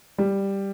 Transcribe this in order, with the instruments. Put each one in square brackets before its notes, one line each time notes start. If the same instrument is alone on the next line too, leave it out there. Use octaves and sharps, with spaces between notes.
[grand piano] G3